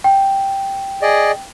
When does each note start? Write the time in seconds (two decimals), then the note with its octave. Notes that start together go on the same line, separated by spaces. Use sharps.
0.04 G5
1.02 G#4 D5 D#5